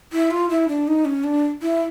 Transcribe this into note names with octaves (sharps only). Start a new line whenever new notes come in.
E4
F4
E4
D4
D#4
C#4
D4
E4